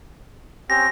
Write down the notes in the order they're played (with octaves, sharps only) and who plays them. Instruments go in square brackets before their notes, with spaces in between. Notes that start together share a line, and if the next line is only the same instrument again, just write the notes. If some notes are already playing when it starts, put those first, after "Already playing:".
[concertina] C4 C#4 G4 [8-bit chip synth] A#6